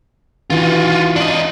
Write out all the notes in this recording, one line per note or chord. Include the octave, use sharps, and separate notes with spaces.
E3 F4 F#4
D4 D#5 F#7